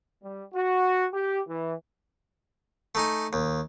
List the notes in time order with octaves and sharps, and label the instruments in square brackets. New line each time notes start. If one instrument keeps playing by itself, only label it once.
[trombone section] G3
F#4
G4
E3
[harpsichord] A3 D#4 G#5
D#2